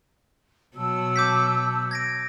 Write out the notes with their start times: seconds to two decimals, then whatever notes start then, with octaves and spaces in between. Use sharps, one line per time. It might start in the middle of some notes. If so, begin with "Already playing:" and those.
0.76 B2 F#3 A5 E6
1.16 D6 G6 B6
1.91 G#6 A#6 D7